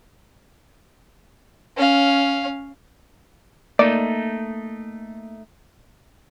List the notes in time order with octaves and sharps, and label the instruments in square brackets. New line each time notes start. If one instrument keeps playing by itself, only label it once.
[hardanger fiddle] C#4 F5
[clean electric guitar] A3 D#4 [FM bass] A#3 [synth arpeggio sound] D5